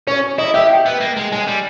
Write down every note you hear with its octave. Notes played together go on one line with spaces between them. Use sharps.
C#4 C#5
E4 D#5
G4 E5
G5
B3
A#3
G#3
G#3 G#5
G3